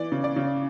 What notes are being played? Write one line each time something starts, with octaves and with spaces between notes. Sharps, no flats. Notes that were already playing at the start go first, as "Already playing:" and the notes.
Already playing: E3 D5
C#3
D5
C#3